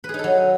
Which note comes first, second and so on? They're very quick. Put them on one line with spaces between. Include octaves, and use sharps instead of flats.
B4 G#4 D#4 A4 F#3